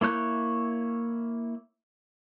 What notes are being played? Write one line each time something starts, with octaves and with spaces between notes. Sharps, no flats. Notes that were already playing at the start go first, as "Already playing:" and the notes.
A#3 E4 C#5 F#6 G6